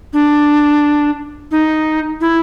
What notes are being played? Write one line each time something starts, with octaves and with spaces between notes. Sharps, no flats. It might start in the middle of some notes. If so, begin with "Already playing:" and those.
D4
D#4
E4